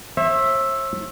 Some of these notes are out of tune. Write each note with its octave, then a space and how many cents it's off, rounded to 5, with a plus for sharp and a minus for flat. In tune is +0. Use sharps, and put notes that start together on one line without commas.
C5 +45 E5 +0